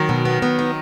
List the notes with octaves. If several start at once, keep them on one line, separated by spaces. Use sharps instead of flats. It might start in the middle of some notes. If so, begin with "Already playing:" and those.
Already playing: D#3 F#3
B2
B3
B3
D#4